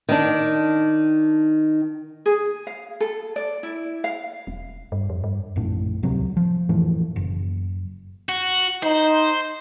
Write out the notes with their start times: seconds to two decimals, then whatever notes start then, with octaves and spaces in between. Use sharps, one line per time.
0.09 D#3 D4
2.26 G#4
2.67 F5
3.00 A4
3.36 D5
3.63 E4
4.04 F5
4.47 E1
4.92 G2
5.10 F2
5.24 G2
5.56 A#1 F#2 A2
6.03 D1 C2 C3 F#3
6.37 F3
6.69 F2 A2 E3 F3
7.16 F#1
8.29 F#4
8.83 D#4 C5